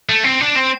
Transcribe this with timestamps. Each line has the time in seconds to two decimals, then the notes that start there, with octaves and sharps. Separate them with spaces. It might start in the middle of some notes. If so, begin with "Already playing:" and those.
0.09 A3
0.24 C4
0.41 D4
0.56 C4